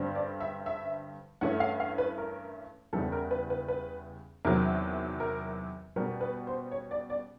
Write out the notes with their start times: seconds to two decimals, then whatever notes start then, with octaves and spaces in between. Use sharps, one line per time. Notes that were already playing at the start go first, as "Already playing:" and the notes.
Already playing: G2 D3 G3 C4
0.15 D5
0.40 E5
0.66 E5
1.41 G2 E3 A3 C#4 F#5
1.60 F5
1.80 F5
1.98 B4
2.18 A#4
2.93 E2 C#3 E3 G3 A4
3.12 A#4
3.31 B4
3.50 B4
3.68 B4
4.45 E2 C3 D#3 F#3 A#4
5.20 A#4
5.96 B2 G3 B3 A#4
6.21 B4
6.47 C5
6.71 C#5
6.91 D5
7.10 D5